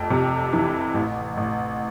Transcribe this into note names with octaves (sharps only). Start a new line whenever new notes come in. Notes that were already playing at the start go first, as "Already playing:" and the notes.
Already playing: F1 F2 G5
C3
E3
A1
A1